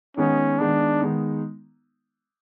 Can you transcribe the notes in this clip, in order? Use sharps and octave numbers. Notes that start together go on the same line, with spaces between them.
D#3 G#3 B3 C#4 D#4
D#3 G#3 B3 D4 D#4
D#3 G#3 B3 D#4